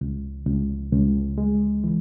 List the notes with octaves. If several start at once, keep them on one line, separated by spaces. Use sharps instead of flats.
C#2
C#2
C#2
G#3
E3